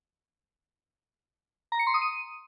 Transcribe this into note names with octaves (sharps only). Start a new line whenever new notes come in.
A#5
C#7
C6
D#6
D#7